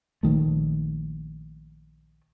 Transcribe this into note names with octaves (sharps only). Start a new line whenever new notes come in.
A#1 D#3 A3